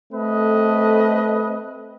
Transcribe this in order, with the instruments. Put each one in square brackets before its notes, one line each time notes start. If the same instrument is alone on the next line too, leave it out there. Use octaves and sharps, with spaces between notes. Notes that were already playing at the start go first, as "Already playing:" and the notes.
[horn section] A3 C4 A4 B4 D#5